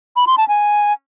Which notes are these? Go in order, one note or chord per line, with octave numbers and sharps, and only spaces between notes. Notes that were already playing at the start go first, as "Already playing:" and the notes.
B5
C6
A5
G#5